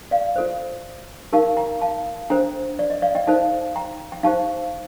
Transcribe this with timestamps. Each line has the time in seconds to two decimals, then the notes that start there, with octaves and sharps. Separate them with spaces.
0.11 D5 F5
0.36 F4 A4 C5
1.33 D#4 G4 A#4 F5 A5
1.57 G5 A#5
1.81 F5 A5
2.30 D4 A4 C5 G5 A#5
2.79 D5
2.90 D#5
3.02 D5 F5
3.15 D#5 G5
3.27 D#4 A4 C5 F5 A5
3.76 G5 A#5
4.12 G5
4.23 D#4 G4 C5 F5 A5